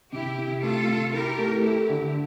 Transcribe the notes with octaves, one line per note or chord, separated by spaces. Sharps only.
C3 E4 G4
C3
A3 F4 A4
C3
E4 G4 A#4
A3
E4 G4 A4
D3